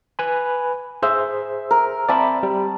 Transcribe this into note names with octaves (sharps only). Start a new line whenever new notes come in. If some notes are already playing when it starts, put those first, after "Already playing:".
B4 G#5 B5
G#4 C5 E5
A#4
C4 D5 E5 A5 B5
G3